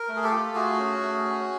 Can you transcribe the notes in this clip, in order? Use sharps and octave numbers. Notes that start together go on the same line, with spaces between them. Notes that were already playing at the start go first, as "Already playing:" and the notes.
Already playing: A#4
A3
G#4
G4 A4
F4
A3 F#4 G#4
C#4
A3
C#4